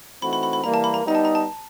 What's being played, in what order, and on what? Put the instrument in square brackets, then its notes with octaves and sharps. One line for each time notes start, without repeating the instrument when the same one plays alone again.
[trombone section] E3 A3 C4 D#4 F#4 [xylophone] B5
[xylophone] B5
B5
B5
[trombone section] E3 G3 A#3 [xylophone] A#5
[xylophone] A5
B5
A#5
[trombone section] G3 B3 D#4 [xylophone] A#5
[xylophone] A5
A#5
A5